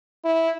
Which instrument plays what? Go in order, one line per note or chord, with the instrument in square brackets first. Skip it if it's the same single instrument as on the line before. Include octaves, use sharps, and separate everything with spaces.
[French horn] E4